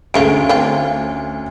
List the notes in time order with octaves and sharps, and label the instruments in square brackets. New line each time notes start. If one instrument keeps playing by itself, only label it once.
[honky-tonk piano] D2 C#4 D7 [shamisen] G#3 A3 F4
[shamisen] C4 F4